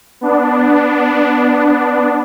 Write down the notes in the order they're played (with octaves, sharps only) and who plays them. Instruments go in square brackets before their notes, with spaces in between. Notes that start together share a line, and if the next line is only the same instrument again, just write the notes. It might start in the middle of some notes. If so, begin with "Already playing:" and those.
[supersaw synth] B3 D4